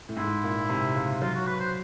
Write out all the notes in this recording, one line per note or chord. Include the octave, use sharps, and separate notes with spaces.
A2
G#2 E4
A#2
C3
C#3
F#3 F4
F#4
B4
C5